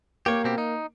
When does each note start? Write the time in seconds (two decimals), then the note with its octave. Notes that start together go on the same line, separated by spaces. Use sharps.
0.26 A#3 G4 C#5
0.44 B2 C4 G4
0.58 D#4